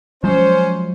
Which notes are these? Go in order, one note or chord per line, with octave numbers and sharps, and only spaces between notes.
F3 F#3 G#3 C#4 C5